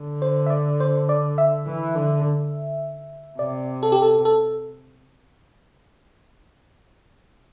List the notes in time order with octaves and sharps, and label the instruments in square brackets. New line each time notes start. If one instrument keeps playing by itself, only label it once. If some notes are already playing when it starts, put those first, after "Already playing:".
Already playing: [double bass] D3
[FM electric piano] C5
E5
D5
C5
D5
E5
[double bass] E3
D3
[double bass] C3 [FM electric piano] D5
[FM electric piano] A4
G4
A4
A4